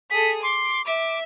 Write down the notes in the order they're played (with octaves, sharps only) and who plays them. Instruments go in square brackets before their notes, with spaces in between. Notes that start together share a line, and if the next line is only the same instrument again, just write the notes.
[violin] G#4 A4 [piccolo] B6
[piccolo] C6 [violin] D6
[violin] E5 [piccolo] D6